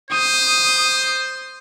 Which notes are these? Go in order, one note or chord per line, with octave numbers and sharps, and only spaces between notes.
C5 D#6